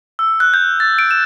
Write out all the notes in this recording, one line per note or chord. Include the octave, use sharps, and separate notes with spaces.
E6
F#6
G6
A6
D7
E7